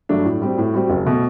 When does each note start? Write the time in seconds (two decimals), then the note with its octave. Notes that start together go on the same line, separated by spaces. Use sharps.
0.09 G2 F#3 A3 D4
0.25 A2
0.42 G3 C4 F#4
0.58 A2
0.74 G3 C4 F#4
0.90 F#1
1.06 B2 A3